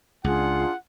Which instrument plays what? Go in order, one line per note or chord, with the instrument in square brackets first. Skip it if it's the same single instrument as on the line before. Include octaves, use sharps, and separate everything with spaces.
[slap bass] C#2 [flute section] D4 F4 [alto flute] G#4 [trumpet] F#5